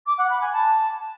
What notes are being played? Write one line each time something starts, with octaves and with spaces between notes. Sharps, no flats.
D6
F#5
B5
G#5
A5